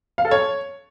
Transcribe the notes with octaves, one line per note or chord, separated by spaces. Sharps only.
F5
A4
C#5